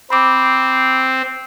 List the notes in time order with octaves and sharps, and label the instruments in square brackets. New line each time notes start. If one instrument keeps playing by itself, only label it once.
[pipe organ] C4 [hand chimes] B5 D6